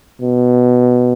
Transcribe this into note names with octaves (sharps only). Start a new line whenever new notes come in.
B2